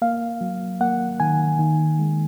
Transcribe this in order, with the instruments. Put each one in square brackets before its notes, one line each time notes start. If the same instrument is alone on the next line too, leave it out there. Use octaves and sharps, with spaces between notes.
[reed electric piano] A#3 F5
F#3
A#3 F#5
D#3 G#5
D#3
G#3